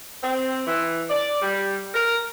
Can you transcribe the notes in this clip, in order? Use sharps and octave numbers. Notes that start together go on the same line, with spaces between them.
C4
E3
D5
G3
A#4